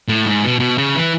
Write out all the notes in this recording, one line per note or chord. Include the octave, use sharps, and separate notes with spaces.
A2
G#2
B2
B2
C#3
E3